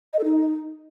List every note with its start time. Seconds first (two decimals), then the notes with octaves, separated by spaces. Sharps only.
0.13 D#5
0.19 A4
0.24 D#4